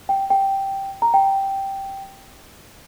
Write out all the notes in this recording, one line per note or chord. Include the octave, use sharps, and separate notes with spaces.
G5
G5
A#5
G5